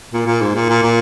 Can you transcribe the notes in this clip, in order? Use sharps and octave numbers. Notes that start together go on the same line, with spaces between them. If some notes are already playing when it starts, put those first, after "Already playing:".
A#2
A#2
G#2
A#2
A#2
A#2